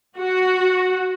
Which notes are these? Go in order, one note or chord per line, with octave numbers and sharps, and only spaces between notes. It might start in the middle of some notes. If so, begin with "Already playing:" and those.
F#4